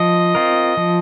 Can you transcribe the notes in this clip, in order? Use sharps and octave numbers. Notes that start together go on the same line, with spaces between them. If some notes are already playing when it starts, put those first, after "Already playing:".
Already playing: F3 D#5
C4 F4 A#4
F3